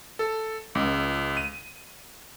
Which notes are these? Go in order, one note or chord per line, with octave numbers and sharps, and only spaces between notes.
A4
C#2
D#7